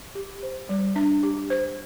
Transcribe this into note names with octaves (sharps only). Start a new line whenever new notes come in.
G4
C5
G3
D4
G4
C5